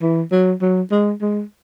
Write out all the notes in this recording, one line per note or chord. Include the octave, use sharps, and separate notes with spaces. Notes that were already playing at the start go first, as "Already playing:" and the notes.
E3
F#3
F#3
G#3
G#3